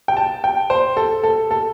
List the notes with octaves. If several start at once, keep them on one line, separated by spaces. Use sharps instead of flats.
G5
A5
G5
C5
A4
A4
A4